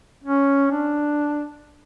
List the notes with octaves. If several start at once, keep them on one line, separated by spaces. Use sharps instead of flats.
C#4
D4